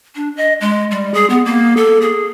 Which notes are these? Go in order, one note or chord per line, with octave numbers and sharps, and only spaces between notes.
D4
D#5
G#3
G3
G#4
B3
A#3
A4
G#4